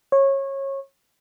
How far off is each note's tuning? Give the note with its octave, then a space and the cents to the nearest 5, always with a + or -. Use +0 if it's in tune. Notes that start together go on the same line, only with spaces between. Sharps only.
C#5 -20